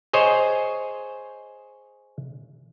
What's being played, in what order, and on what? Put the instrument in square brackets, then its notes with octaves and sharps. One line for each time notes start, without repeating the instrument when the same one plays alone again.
[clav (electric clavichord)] G#4 C5 C#5 D#5